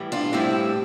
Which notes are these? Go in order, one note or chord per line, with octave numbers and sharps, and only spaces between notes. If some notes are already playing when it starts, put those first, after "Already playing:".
Already playing: A2 E3 G3
D4 F4
A2 E3 G3 C4 E4